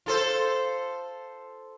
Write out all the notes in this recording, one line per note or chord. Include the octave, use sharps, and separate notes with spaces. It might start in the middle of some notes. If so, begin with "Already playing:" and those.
F4 A4 C5